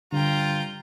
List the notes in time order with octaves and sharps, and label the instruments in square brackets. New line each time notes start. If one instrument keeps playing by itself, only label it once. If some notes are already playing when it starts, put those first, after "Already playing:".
[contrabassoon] G2 [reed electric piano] D3 [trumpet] F4 [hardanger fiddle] G5 A#5